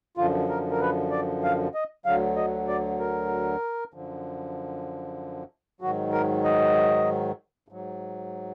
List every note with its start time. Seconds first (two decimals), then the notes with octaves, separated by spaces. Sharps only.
0.17 F#2 D3 F3 F4
0.49 A#4
0.71 A#4
0.81 B4
1.11 D5
1.44 F5
1.75 D#5
2.06 D2 D3 F#3 F5
2.36 D#5
2.68 D5
3.00 A#4
3.94 F#2 D3 F3
5.81 G#2 D#3 F#3 F#4
6.13 A#4
6.44 D#5
7.68 G#2 F#3